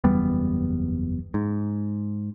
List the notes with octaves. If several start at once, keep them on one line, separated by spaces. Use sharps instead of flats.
F#1 E2 G3 B3
G#2